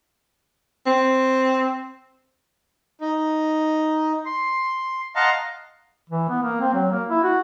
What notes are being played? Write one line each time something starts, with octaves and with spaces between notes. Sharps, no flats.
C4
D#4
C6
D#5 F5 F#5 A5 A#5 C6
E3
B3
A#3
C4
F#3
A#3
E4
F#4